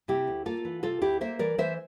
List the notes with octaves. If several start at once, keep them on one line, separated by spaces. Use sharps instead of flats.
C3 E4 G4
D2
A#3 F4 A4
E3
C3 F4 A4
D2 E4 G4
A#3 C5 E5
E3 A#4 D5
E3 C5 E5